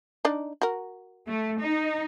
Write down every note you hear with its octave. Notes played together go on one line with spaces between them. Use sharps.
D4 D#4 D5
F#4 A#4
A3
D#4